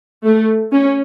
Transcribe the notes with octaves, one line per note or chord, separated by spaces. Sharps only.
A3
C#4